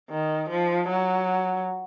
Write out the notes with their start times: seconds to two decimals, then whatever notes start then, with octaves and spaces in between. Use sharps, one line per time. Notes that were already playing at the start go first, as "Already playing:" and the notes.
0.10 D#3
0.50 F3
0.89 F#3